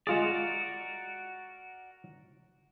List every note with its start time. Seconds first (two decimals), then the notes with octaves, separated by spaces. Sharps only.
0.07 G#3 F4 F#4 G#4 A#4 D5